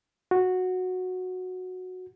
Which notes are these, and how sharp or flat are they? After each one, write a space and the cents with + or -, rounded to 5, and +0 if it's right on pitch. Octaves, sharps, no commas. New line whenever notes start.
F#4 -10